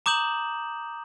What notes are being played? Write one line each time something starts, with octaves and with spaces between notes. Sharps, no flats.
A#5 D6 D#6 G6 E7 F#7